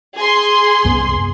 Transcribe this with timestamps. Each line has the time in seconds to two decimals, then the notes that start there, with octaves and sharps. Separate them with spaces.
0.17 G#4 C6
0.85 C2 F#2 B3